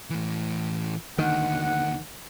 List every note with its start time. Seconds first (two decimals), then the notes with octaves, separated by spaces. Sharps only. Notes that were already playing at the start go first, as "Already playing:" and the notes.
0.10 A2 E3
1.19 D#2 D3 D#3 F#5